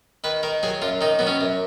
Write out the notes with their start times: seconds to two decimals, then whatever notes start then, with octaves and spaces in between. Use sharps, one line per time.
0.24 D#3 B4
0.43 D#3 A#4
0.63 F#3 G#4
0.82 F#2 F4
1.01 D#3 D#4
1.19 F#3 B3
1.27 C#4
1.41 F#2